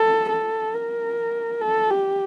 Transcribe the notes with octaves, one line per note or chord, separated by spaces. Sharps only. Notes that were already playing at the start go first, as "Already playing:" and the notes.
Already playing: A4
A4
A#4
A4
G4